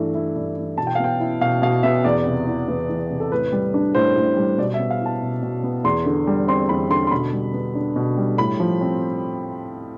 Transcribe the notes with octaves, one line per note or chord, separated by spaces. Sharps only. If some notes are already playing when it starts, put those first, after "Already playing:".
Already playing: G2 E3 A3
E4
G2
E3
B2 A5
G5
F5
B3 G5
E4
B2 F5
B2 F5
B3 E5
E2 D5
C3
E3
E2 B4
E2
C3
A4
A2 B4
G3
D4
A2 C5
A2
G3
B2 D5
E5
B3
F5
E4 A5
B2
B2
B3
E2 C6
D3
G3
C4 C6
E2 B5
D3 C6
C6
B2 B5
G3
B3
D4
B2
G3
A2 B5
F3
C4